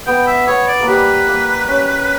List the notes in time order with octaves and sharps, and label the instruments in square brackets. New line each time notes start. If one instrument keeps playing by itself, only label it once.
[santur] B3 [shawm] G5
[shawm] E5
[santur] B3 [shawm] C#5
[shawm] D5
[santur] A#3
[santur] G3 [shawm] B4
[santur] A#3
C#4